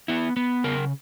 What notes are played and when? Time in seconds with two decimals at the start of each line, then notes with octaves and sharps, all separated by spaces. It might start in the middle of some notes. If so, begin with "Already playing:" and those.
0.08 B3 E4
0.37 B3
0.64 C#3 A#4